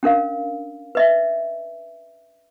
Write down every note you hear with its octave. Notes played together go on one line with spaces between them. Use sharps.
C#4 D4 A#4 F5
B4 D#5 E5